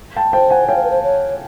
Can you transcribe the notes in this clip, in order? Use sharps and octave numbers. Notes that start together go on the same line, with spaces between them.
G5 A5
C5 G5 A5
F#5 G#5
C#5 F5 G5
C5
B4
C5
C#5